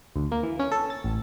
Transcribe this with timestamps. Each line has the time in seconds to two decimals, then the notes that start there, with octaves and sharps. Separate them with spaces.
0.16 D2
0.32 A#3
0.43 E3
0.59 C#4
0.72 A4
0.90 A6
1.04 A1